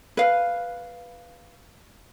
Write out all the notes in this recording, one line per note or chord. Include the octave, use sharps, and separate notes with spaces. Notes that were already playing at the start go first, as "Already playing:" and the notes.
B4 F5